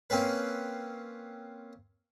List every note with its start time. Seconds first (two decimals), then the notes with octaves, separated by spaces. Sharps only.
0.10 A#3 C4 C#4 B4